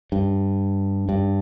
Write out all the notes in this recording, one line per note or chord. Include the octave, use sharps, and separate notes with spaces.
G2
G2